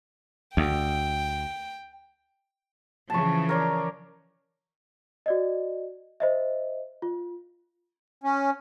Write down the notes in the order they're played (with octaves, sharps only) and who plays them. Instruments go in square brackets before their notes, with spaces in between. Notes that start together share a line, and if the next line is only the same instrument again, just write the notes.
[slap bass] D2 [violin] G5
[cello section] C#3 E3 F3 [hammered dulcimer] A5 C#6
[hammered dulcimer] A#4 C#5 D5
[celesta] F#4 D5 D#5
C5 D#5 E5
F4
[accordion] C#4